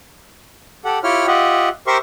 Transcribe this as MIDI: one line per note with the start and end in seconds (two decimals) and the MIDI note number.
0.85 0.99 67
0.85 0.99 69
0.85 0.99 78
1.04 1.27 64
1.04 1.27 65
1.04 1.27 67
1.04 1.27 73
1.04 1.27 79
1.04 1.27 89
1.27 1.69 65
1.27 1.69 67
1.27 1.69 75
1.27 1.69 76
1.27 1.69 78
1.87 1.97 67
1.87 1.97 70
1.87 1.97 72
1.87 1.97 76
1.87 1.97 84
1.87 1.97 85